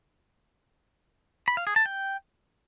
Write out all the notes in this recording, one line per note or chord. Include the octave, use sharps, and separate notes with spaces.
B5
F5
G#4
A5
G5